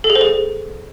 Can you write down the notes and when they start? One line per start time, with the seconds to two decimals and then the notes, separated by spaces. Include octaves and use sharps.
0.04 A4
0.10 G#4
0.15 C5
0.21 G#4